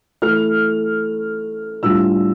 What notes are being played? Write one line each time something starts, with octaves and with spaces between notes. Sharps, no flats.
E3 A3 E4 F6
A2 G3 D4 F4 E6